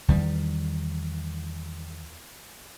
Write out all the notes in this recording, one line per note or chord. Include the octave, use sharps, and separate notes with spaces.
E2 D#3 G3